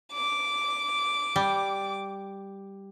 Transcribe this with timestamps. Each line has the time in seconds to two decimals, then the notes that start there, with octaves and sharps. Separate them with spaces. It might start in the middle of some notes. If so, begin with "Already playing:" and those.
0.13 D6
1.36 G3